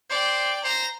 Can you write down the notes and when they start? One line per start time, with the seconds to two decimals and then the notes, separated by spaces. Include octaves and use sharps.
0.10 C5 D5 G5
0.64 C5 A#5 A#6